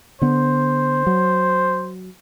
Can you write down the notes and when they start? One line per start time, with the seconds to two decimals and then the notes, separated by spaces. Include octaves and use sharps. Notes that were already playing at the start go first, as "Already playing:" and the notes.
0.22 D3 B3 C5
1.07 F#3